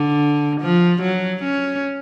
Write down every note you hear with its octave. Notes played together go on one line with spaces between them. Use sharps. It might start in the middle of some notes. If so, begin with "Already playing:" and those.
Already playing: D3
F3
F#3
C#4